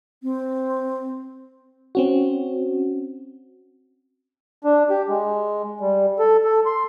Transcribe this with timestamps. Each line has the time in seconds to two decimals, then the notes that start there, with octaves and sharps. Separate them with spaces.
0.23 C4
1.95 C4 C#4 F#4
4.64 D4
4.90 G4
5.09 G#3
5.81 G3
6.19 A4
6.44 A4
6.66 C6